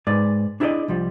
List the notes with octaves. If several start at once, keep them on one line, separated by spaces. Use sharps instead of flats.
G#2 G#3 B4 D5
D4 E4 G#4 B4 D5 D#5
C2 F3 G3